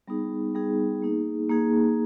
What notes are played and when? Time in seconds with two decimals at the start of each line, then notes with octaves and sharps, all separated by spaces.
0.08 G3 B3 D#4 G#4
0.55 G3 B3 D#4 G#4
1.02 A#3 D#4 G#4
1.50 A#3 D#4 G#4